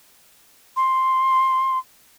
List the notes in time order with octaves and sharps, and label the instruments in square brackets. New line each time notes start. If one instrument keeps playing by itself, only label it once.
[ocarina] C6